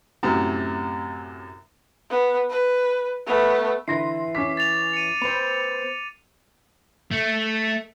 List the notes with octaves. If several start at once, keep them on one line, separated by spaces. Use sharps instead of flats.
F#2 A2 C3
B3
B4
A3 B3
D3 E3 E4 C6 A#6 C7
C#4 D6 B6
A6 F7
C#7 D#7
B3 C5 B5 F7
A3